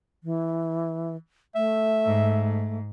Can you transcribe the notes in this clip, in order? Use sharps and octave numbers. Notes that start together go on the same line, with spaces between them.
E3
A3 E5
G#2